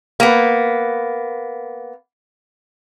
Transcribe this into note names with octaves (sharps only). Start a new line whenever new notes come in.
A#3 B3